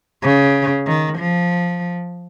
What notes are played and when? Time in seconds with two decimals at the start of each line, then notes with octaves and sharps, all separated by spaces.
0.23 C#3
0.86 D#3
1.19 F3